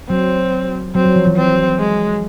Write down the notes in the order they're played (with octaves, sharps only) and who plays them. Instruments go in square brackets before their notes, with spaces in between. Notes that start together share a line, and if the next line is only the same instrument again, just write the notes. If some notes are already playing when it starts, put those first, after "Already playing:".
[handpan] F#3 [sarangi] C4
[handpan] F#3 [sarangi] C4
[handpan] F#3
F3
E3
[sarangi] C4
G#3